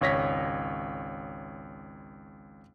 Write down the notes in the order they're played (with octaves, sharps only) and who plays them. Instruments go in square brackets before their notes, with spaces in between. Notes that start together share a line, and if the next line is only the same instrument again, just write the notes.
[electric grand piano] G#1 C#2 C#5 A#6 B6